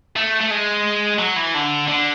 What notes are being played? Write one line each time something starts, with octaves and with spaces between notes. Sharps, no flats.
A3
A3
G#3
F#3
E3
D3
D3